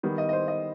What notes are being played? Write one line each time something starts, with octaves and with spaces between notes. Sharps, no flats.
D#3 G3 B3
D#5
D#5
C5
D#5